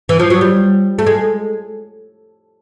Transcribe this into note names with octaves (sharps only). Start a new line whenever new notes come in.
E3
F3
F#3
G3
A3
G#3